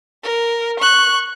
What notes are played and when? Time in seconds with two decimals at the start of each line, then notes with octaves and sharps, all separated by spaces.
0.23 A#4
0.80 C#6 F#6